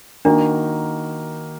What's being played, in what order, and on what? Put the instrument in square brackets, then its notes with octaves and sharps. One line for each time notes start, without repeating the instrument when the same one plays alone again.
[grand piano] D#3 A#3 D#4 F#4 A#4 [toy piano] D4